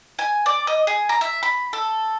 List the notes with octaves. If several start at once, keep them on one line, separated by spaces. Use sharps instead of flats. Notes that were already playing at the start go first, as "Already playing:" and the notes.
G#5
D5
D#5
G#4
A#5
E5
B5
A4